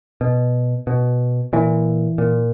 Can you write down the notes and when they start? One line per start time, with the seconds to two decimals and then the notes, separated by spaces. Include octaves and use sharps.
0.21 B2
0.87 B2
1.53 A#2 E3
2.18 A#2